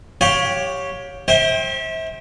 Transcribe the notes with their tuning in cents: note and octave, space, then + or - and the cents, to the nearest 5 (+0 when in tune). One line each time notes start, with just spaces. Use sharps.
G4 +0 C#5 +0 F5 +35
C5 +30 E5 -30 G5 +0